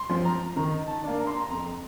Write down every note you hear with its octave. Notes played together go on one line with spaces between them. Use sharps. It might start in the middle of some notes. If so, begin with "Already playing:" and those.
Already playing: C6
F3 C4
A#5
D#3 A#5
A5
A#3 D4
A#5
C6
A#5
F2 A#5